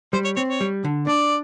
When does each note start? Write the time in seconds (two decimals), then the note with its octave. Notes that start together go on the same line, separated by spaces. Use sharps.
0.13 G3 C5
0.24 C#5
0.36 C4 C#5
0.48 C#5
0.61 G3
0.85 D3
1.07 D4 D5